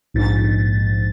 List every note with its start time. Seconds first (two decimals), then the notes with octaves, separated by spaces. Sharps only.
0.14 A#1 G#2 A6